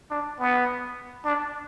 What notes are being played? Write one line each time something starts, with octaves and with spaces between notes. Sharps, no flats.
D4
B3
D4